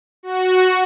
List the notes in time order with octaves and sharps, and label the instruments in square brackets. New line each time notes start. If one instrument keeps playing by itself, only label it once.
[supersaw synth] F#4